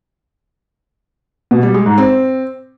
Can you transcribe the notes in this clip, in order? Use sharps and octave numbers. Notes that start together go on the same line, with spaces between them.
B2
G3
G#3
G#2
C4